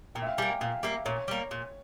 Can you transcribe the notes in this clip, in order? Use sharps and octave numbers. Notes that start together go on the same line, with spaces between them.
A#2 G5
E5
F5
G3 A#3 G#5
G5
A#2 F5
G3 A#3 E5
A#2 C#5
G3 A#3
A#2